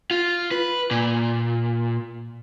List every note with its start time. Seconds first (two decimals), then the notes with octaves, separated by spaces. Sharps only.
0.11 F4
0.51 B4
0.91 A#2